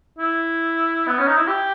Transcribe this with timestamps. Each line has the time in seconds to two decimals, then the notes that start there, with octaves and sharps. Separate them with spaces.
0.19 E4
1.07 B3
1.18 C#4
1.28 D#4
1.37 E4
1.48 G4